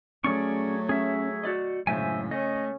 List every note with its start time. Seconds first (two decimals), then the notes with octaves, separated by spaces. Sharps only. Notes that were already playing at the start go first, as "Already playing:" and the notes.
0.24 F#3 A3 C#4 G#4 D5 C#6
0.89 C#4 G#4 E5
1.44 F#4 D5 D#5
1.87 F#2 A2 C#3 G#3 C5 E5 G#5
2.31 A3 C#4 D#5